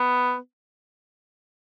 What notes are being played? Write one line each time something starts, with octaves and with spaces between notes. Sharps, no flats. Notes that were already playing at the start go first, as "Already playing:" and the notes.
Already playing: B3